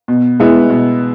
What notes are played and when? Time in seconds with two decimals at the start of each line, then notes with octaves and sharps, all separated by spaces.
0.08 B2
0.40 G#3 B3 E4
0.70 B2